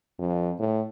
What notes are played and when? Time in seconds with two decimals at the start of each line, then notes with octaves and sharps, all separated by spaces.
0.19 F2
0.59 A2